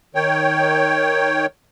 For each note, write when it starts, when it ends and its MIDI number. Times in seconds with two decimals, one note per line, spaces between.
0.15 1.46 51
0.15 1.46 73
0.15 1.46 79